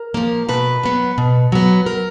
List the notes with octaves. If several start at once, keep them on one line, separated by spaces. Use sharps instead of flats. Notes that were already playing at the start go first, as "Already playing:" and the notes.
Already playing: A#4
F3 A#3
B2 B4
F#3 B3
B2
F#3 B3
A#4